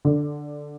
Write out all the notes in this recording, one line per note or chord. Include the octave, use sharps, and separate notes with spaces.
D3